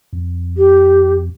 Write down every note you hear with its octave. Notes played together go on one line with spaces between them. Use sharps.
F2
G4